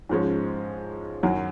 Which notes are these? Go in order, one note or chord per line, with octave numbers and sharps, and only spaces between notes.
G#2 F3 G#3 C#4
F#2 D#3 F#3